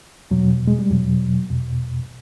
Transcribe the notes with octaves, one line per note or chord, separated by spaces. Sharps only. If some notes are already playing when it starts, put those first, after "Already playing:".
E2 B2 F#3
G#3
G3
E2 B2 F#3
E2 B2